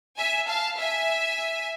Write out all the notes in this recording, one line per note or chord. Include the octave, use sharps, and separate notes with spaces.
E5 G#5
F5 A5
E5 G#5